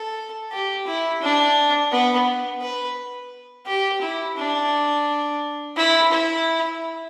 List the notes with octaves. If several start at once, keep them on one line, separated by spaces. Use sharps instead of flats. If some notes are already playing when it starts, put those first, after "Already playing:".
Already playing: A4
G4
E4
D4
B3
B4
G4
E4
D4
E4
E4